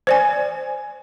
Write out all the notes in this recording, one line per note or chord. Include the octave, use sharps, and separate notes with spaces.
C5 D5 G#5